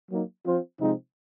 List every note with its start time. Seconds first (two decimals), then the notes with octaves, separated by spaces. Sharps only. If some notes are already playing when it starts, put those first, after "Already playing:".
0.11 F#3 A#3 D#4
0.46 F3 C4 F4 C5
0.80 C3 F3 G#3 C4 D#4